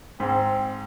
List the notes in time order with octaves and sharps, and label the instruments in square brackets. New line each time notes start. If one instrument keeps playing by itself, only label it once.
[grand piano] G#2 [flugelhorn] C4